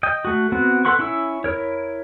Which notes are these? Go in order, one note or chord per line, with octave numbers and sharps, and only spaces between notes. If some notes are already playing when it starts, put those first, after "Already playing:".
D#5 G5
A3 F#4
B3 C4 F#4
A4 B4 F#5 C6 C#6
C#4 E4 C#6 E6
E4 A#4 C#5